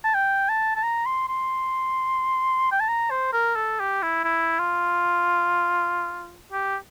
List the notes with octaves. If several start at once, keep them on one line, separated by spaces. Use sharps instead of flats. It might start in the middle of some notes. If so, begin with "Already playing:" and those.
A5
G5
A5
A5
A#5
C6
C6
G5
A5
A#5
C5
A#4
A4
G4
E4
E4
F4
G4